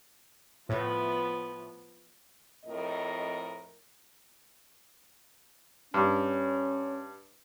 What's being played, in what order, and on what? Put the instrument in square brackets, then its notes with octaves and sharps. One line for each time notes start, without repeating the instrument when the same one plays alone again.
[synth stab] A2 [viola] F3 B3
[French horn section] F2 A2 A#4 D#5
[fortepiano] G2 [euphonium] C#4